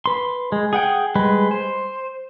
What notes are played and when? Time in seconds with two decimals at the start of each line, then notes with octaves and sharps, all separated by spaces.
0.06 B4 C6
0.52 G#3
0.73 G#4 F#5 G5
1.15 G3 G#3 B4
1.51 C5